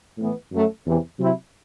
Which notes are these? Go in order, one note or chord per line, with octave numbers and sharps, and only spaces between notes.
A2 E3 B3
F#2 F#3 A3
E2 C3 E3
C3 F#3 C4 E4